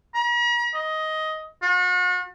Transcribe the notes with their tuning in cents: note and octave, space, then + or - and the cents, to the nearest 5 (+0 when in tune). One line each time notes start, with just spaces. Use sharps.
A#5 +45
D#5 +10
F#4 -40